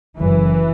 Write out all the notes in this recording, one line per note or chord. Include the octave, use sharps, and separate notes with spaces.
F#1 F#2 E3